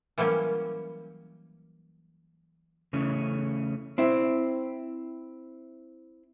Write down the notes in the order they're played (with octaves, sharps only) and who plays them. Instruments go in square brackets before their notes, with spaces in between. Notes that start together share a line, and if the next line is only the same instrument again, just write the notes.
[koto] E3 F#3 G3 A#3 C#4
[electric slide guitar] C#3 E3 A3 C#4
[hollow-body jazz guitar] C4 E4